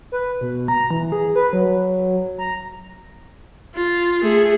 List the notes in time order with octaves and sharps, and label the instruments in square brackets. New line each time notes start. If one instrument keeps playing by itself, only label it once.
[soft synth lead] B4
B2
A#5
E3
G#4
B4
F#3
A#5
[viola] F4
A3 G#4